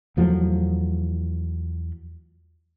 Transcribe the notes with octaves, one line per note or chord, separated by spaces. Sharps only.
E2 F3 F#3 A3